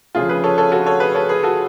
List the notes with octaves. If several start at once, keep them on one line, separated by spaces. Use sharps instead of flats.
D2 C#3 F3 F4 G#4
G#4 B4
A4 C#5
A4 C#5
F#4 A4
A4 C#5
G#4 B4
A4 C#5
G#4 B4
F#4 A4